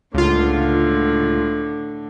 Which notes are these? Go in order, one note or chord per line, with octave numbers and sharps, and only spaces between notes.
C#2 A2 D3 F4